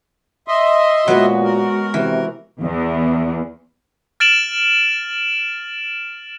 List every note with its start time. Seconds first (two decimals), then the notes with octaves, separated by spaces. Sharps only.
0.48 D#5 E5 C6
1.08 A#2 F#3 G#3 B3 F#4
1.44 A#4
1.94 C3 E3
2.62 E2
4.20 F6 A6 D7 E7 F#7